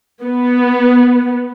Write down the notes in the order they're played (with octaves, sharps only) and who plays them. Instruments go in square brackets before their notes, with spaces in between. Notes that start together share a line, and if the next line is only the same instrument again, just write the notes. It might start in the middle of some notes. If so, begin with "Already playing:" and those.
[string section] B3